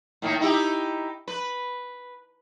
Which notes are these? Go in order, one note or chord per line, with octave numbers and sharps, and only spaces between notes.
A2 D#3 A#3
D#4 E4 G4
B4